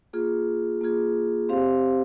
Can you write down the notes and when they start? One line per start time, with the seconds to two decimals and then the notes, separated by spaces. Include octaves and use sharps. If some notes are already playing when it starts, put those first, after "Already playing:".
0.13 A#3 F4 G#4
0.81 A#3 F4 G#4
1.49 C4 G4 C5 F5